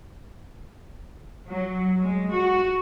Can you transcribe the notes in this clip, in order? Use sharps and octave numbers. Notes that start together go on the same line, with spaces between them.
F#3
G#3
F#4